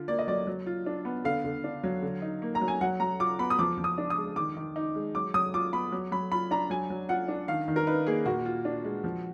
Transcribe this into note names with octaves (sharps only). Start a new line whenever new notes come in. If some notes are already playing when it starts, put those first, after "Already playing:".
Already playing: D3 F4
A#3 D5
D#5
F#3 D5
F#3
F4
D4
B3
D3 F5
D3
D4
F#3
D3
D#4
A#3
A#5
F#3
G#5
F#3 F#5
F#3 A#5
F4 D6
B3 B5
D#6
F3 D6
F3
D#6
D4
D#6
G#3
D#3 D6
D#3
D#4
G#3
F#3 D6
F#3 D#6
F4 D6
B3 B5
F#3
F#3 B5
F4 B5
D4 A#5
F#3 G#5
F#3
F4 F#5
D4
D#3 F5
D#3
A#4
D#4 B4
A#3 G#4
A#2 F#4
F4
D4
G#3
F3